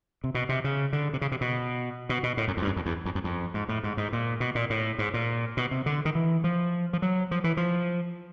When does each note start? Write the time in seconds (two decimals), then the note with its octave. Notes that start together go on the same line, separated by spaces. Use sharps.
0.24 C3
0.35 B2
0.49 C3
0.64 C#3
0.93 D3
1.13 C3
1.21 C#3
1.32 C3
1.41 B2
2.09 B2
2.23 B2
2.37 A2
2.48 F#2
2.57 F2
2.62 G2
2.67 F#2
2.76 F2
2.86 E2
3.05 F2
3.15 F#2
3.24 F2
3.54 G#2
3.69 A2
3.84 G#2
3.97 G#2
4.13 A#2
4.40 B2
4.55 A#2
4.70 A2
4.99 G#2
5.14 A#2
5.57 B2
5.71 C3
5.86 D3
6.05 D#3
6.15 E3
6.44 F3
6.93 F3
7.02 F#3
7.31 F3
7.44 E3
7.57 F3